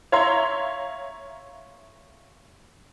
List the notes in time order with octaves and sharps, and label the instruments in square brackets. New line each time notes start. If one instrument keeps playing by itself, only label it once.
[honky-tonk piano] C#5 E5 F5 A#5 C6